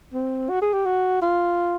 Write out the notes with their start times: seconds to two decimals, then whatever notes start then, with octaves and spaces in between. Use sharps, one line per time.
0.13 C4
0.49 F#4
0.61 G#4
0.73 G4
0.85 F#4
1.22 F4